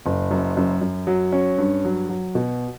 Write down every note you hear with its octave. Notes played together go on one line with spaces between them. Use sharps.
F#1
F#2
F#2
F#2
F#3
C#4
G2
F#3
F#3
B2